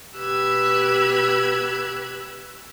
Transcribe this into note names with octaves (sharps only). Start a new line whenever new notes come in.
B2 G4 B4 E6 F#6 G#6